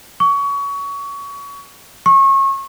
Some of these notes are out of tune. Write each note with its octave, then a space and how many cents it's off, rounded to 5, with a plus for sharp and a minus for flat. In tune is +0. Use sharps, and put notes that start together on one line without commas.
C#6 +25
C#6 -30